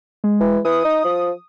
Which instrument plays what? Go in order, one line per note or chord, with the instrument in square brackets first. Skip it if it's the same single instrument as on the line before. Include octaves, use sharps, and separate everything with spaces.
[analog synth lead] G#3
[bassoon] E3
[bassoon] E3 [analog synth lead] D#6
[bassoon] D#4
F3